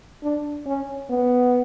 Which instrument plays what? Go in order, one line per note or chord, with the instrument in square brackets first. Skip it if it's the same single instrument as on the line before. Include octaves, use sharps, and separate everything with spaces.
[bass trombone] D4
C#4
B3